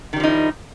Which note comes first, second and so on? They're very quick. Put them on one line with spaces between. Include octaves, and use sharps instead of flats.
D#3 G3 F3 D#4 E4